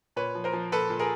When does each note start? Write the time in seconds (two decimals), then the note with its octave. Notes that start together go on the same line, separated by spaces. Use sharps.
0.16 A#2 B4 C#5
0.35 F3
0.44 A#4 C5
0.53 F3
0.72 A#2 A4 B4
0.90 A#2
0.99 G#4 A#4